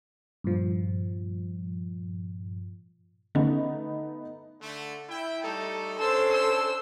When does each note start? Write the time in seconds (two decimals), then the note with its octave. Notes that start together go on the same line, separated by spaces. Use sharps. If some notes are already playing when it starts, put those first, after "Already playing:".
0.44 G2 A#2 F3
3.35 D3 A3 B3 C#4 D#4
4.60 D3 A3
5.09 E4 G5
5.43 G3 A3 D#4 A4
5.99 C#4 D4 A4 C5 C6 E6
6.31 E6